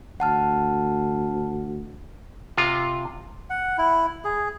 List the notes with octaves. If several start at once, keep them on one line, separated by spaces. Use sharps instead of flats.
D2 F#5 A5 F6
C3 F4
F#5
E4
G#4